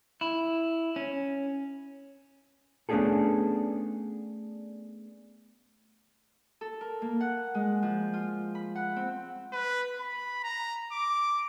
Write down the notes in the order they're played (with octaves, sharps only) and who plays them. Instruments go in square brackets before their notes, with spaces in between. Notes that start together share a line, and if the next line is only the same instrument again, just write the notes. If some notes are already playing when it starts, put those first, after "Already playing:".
[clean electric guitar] E4
C#4
[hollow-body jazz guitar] A3 B3 C#4 D4 G#4 A4
[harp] A4
A#4
A#3
F#5
G#3
F3
F4
B5
F#5
C4
[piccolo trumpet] B4
B5
A#5
D6